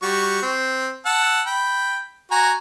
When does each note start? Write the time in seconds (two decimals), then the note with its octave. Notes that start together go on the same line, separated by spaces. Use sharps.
0.02 G3 F#4 C#6
0.42 C4
1.06 F#5 A5 E6
1.47 G5 B5
2.31 F#4 G#5 A#5